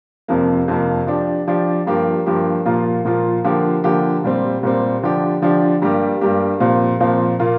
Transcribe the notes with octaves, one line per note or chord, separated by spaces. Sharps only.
F2 C3 F3 A#3
F2 C3 F3 A#3
F3 D4 G4
F3 D4 G4
G2 F3 A#3 G4
G2 F3 A#3 G4
A#2 F3 A#3 F4
A#2 F3 A#3 F4
D3 F3 A#3 G4
D3 F3 A#3 G4
A#2 G3 C4
A#2 G3 C4
D3 F3 D4 G4
D3 F3 D4 G4
G2 G3 A#3 G4
G2 G3 A#3 G4
A#2 F3 C4
A#2 F3 C4
A#2 A#3 F4